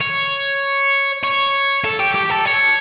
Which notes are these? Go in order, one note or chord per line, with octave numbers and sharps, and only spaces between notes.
C#5
C#5
A4
G4
G4
A4
C#5